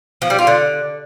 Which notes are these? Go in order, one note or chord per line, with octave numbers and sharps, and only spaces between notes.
F3
G3
F4
D3